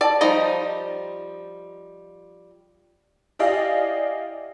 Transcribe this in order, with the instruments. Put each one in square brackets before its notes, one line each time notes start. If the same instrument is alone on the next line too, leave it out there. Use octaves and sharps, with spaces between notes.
[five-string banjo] D5 A5
F3 G3 D#4 D#5 A#5
[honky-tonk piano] E4 G4 D5 D#5 F5 G#5